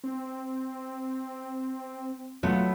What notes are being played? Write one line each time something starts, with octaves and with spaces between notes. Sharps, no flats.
C4
F#3 A3 B3 F4